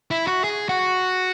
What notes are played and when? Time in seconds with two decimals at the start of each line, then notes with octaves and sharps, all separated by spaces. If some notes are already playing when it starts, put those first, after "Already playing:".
0.11 E4
0.27 F#4
0.44 G#4
0.69 F#4